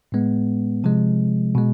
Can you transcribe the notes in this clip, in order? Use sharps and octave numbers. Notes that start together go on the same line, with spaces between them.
A2 G#3 B3
C3 F3 G#3
B2 G#3